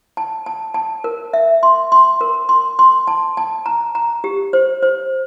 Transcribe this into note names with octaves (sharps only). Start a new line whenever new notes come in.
A5
A5
A5
A#4
E5
C6
C6
A#4
C6
C6
A5
A5
A#5
A#5
G4
C5
C5